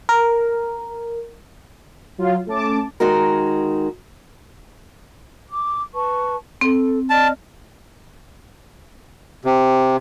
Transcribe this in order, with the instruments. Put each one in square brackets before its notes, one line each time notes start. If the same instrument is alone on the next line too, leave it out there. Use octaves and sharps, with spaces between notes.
[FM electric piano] A#4
[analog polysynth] F#3 F4
A3 C#4 A5 D6
[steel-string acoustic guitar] D#3 G#3 D#4 F#4 A#4
[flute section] D6
B4 A5 C#6
[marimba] C4 [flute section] A4
[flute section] D5 D#5 F6 [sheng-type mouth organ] A5
[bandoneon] C3